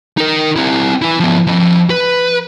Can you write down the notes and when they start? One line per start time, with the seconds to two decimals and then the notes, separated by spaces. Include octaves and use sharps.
0.17 D#4 A#4
0.56 C4 E4
1.02 E4 B4
1.20 F3 B3
1.47 F3 D#5
1.90 B4